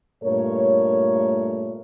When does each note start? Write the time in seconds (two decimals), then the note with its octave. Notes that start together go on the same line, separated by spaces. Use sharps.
0.23 G2 A#2 A3 A#4 C#5